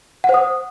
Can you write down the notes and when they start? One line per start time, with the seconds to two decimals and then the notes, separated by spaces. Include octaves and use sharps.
0.24 F#5
0.29 C5
0.34 D#6